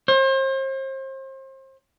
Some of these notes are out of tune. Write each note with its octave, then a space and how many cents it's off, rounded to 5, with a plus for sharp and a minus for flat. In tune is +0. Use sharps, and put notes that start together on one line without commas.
C5 +35